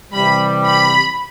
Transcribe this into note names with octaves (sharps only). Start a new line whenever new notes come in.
C3 E3 G3 B5
B5